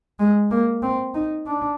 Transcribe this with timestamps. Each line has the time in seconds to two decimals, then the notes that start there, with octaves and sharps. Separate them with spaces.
0.19 G#3
0.51 A#3
0.83 C4
1.14 D#4
1.46 D4